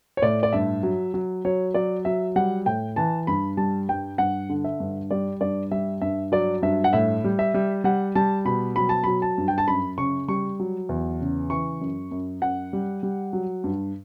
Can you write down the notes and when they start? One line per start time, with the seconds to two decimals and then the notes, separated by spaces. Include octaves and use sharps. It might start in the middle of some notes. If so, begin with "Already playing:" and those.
0.17 C#5
0.22 A2 D5
0.43 D5
0.53 G2 E5
0.83 F#3
1.14 F#3
1.45 F#3 C#5
1.74 F#3 D5
2.05 F#3 E5
2.36 G3 F#5
2.66 A2 G5
2.96 E3 A5
3.27 G2 B5
3.57 G3 A5
3.89 G2 G5
4.18 G2 F#5
4.49 D3
4.64 E5
4.80 G2
5.11 G3 D5
5.41 G2 D5
5.71 G3 E5
6.01 G2 E5
6.32 F#3 D5
6.62 G2 E5
6.84 F#5
6.93 A2 E5
7.24 G3
7.39 E5
7.54 G3
7.84 G3 F#5
8.15 G3 A5
8.45 B2 B5
8.76 F#3 B5
8.89 A5
9.04 F#3 B5
9.22 A5
9.38 G2
9.48 G5
9.58 A5
9.68 F#2 B5
9.98 C#3 C#6
10.28 G3 C#6
10.59 F#3
10.89 E2
11.21 C#3
11.50 E3 C#6
11.81 F#2
12.11 F#2
12.42 F#2 F#5
12.73 G3
13.03 G3
13.33 F#3
13.64 G2